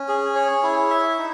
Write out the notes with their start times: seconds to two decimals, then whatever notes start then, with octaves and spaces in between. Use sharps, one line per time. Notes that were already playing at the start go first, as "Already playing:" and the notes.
Already playing: C#4
0.08 G#4
0.36 C#5
0.63 E4
0.90 E5
1.18 D#4